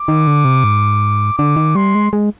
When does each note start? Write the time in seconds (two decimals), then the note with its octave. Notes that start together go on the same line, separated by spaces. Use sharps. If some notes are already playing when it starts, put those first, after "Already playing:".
Already playing: D6
0.08 D#3
0.27 D3
0.45 C3
0.64 G#2
1.38 D3 D6
1.56 D#3
1.75 G3 C6
1.95 G#3
2.13 G#3